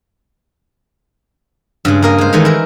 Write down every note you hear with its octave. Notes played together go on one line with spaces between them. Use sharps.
G2 C#3 G#3
A#3 A#4 D#5
G#3 C5
D#3 E3 G#3 A3 D#4
E4 A#4